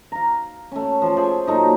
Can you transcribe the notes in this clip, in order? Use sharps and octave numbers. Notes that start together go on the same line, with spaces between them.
F5 A#5
A3 C#4
F3 A4
G#4 C5 D5 E5
A#2 F#3 A3 D#4